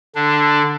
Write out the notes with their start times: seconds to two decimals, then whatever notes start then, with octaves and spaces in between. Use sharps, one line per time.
0.15 D3 D4